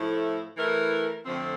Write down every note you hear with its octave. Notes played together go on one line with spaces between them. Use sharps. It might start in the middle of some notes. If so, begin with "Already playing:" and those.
Already playing: A2 F3 A3 E4
E3 A3 E4 A#4
F2 D3 F3 A3 C4